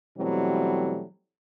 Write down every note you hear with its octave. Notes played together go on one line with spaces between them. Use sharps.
B2 E3 F#3 G3 A3 C4